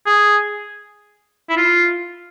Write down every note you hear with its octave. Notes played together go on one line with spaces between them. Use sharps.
G#4
E4
F4